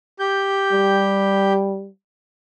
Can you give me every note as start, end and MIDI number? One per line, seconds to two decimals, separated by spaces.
0.20 1.53 67
0.20 1.53 91
0.72 1.88 55